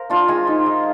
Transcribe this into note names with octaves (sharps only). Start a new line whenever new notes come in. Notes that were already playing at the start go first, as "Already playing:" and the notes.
Already playing: A#4 C5 F5
D4 F4
G#3 G#5
D#4
G#3